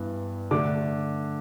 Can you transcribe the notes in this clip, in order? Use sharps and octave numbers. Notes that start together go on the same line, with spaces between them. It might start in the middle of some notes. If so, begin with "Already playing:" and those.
Already playing: G2 E3 B3
D3 A3 D4 D6